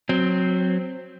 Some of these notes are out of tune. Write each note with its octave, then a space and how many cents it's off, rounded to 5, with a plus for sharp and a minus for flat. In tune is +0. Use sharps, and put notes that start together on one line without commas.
F#3 -15 C4 +0